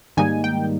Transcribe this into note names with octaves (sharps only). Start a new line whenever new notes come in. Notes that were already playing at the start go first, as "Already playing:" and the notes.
G#2 D#3 G3 A#3 D#4 G#5
G5